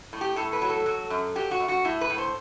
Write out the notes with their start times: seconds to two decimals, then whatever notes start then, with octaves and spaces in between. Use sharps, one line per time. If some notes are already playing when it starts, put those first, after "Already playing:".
0.13 A2
0.21 G4
0.36 A2 A4
0.53 B4
0.62 F#3
0.70 A4
0.86 F#3
1.10 F#2
1.36 F#3 G4
1.51 F#4
1.60 F#2
1.69 F#4
1.85 A2 E4
2.01 B4
2.10 A2
2.18 C5